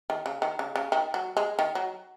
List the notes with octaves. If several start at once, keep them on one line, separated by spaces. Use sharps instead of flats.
D#3
C#3
D#3
C#3
C#3
D#3
F#3
G#3
D#3
F#3